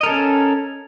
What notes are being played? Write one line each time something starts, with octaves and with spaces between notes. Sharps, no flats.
C#4 A4 A#4 D#5